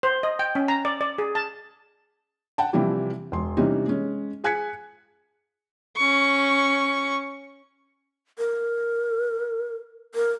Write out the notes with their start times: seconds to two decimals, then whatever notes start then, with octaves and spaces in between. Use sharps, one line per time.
0.03 C5
0.23 D#5
0.39 G5
0.55 C#4
0.68 A#5
0.85 D5
1.01 D5
1.18 G#4
1.35 A5
2.58 F#5 G5 A5
2.73 C3 E3 F3 G3 E4 G4
3.32 E1 C6
3.57 C3 E3 G3 C#4 D#4
3.88 G#3 C#4
4.44 G#4 G#5 F#6 G#6 B6 C#7
5.97 C#4 C#6
8.38 A#4
10.15 A#4